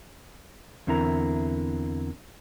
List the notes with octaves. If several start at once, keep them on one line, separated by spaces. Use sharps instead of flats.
E2 D3 C4 E4 A#4 A#5